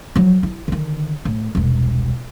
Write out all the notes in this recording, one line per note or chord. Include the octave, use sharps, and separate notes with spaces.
F3 F#3
E4
D3 D#3
A2
E1 C2